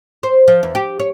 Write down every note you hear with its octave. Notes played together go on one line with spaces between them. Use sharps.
C5
F3
E2
G4
C#5